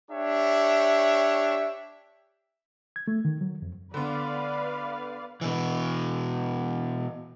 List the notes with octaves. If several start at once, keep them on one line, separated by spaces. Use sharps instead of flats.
D4 G4 C#5 E5
G#6
A3
D#3
F#3
F2
D3 B3 B4 D5 F5
B2 E3